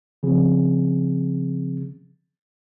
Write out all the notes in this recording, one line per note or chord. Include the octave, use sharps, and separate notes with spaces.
C#3 F3 C4 G#4